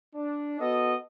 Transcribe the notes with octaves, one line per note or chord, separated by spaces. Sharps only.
D4
B3 F#4 A4 D#5